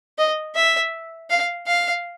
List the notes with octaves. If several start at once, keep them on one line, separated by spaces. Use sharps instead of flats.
D#5
E5
F5
F5